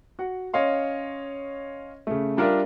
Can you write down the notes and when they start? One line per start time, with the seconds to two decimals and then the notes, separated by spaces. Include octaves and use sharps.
0.19 F#4 F#5
0.54 C#4 C#5 D#5 F5 C6
2.07 C#3 A3
2.37 G3 D4 F4 A#4 D5 E5